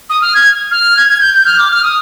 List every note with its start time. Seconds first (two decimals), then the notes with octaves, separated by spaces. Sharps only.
0.09 D#6
0.21 F6
0.34 G#6
0.71 F6
0.96 G#6
1.08 G#6
1.21 G6
1.33 G6
1.45 F6
1.58 D6
1.70 F6
1.82 D#6